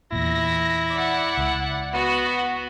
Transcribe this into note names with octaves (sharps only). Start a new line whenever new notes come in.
E2 A#2 E4 A#6
D5 F#5
C#2
B3 F#4